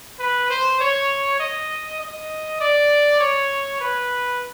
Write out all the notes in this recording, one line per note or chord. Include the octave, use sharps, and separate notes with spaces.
B4
C5
C#5
D#5
D#5
D5
C#5
B4